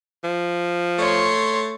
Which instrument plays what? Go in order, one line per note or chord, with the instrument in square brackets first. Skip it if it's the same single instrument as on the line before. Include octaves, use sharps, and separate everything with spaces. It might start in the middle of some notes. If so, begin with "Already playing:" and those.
[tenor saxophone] F3
[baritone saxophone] A3 [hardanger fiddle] C#5 C6